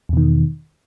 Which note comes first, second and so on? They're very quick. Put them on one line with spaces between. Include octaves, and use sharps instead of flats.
E2 B2 D#3